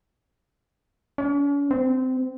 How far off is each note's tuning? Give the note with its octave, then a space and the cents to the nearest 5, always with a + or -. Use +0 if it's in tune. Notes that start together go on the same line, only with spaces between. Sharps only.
C#4 +45
C4 -20